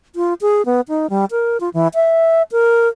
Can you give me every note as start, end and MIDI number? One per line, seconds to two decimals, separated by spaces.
0.16 0.34 65
0.41 0.65 68
0.65 0.81 59
0.88 1.09 63
1.10 1.25 55
1.31 1.60 70
1.60 1.69 65
1.74 1.88 52
1.94 2.42 76
2.52 2.88 70